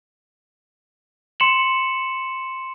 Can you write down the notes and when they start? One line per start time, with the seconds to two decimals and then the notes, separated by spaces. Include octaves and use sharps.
1.40 C6 C#7 E7 F#7